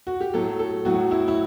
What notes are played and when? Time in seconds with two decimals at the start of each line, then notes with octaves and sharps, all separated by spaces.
0.07 F#4
0.21 G4
0.34 A2 F#3 A4
0.59 A4
0.85 A2 F#3 F#4
1.11 E4
1.28 E4